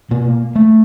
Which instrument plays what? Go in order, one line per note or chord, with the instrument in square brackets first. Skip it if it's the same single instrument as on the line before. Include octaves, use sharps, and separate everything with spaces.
[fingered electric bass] B2 A#3
A3